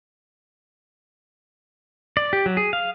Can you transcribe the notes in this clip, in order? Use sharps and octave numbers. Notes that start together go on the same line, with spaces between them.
D5
G4
F#3
G#4
F5